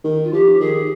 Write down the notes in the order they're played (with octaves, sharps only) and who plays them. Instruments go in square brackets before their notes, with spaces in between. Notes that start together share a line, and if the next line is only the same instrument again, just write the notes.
[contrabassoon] D#3
[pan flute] F4
[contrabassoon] F3 [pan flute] G4
[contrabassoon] D#3 [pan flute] G#4